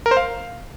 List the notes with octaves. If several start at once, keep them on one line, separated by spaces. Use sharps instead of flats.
A#4
C5
F5